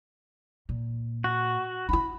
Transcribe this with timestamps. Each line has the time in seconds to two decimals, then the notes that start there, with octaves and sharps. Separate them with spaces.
0.69 A#2
1.24 F#4
1.89 D#4 E4 B5